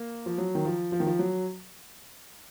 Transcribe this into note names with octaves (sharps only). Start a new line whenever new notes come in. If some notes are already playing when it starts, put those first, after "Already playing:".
Already playing: A#3
F3
F#3
D#3
F3
F3
D#3
F3
F#3